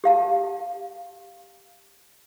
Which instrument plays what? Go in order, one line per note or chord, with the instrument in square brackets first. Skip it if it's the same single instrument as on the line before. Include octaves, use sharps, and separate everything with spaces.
[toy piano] G4 F5 A5